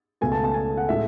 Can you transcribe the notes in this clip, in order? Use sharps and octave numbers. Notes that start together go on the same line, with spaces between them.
C#2 B2 A3 G#5
A5
A5
G#5
F#5
A2 G#3 E5